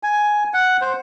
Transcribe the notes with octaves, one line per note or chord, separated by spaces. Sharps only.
G#5
F#5
C5